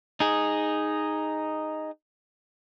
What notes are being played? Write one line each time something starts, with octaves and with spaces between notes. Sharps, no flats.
D#4 G#4